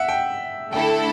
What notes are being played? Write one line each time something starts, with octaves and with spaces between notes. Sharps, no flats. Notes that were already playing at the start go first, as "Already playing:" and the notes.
Already playing: E5 F#5
G5
D3 A3 E4 A4 G5